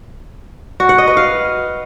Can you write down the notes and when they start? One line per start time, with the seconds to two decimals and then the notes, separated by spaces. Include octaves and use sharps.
0.80 F#4
0.89 F#5
0.98 D#5
1.08 B4
1.17 F5